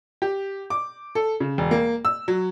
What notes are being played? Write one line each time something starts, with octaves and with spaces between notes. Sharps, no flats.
G4
D6
A4
C#3
E1
A#3
E6
F#3